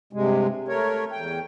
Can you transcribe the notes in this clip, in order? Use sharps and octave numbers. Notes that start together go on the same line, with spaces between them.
G2 C3 G#3
A3 A#4 C#5
E2 G5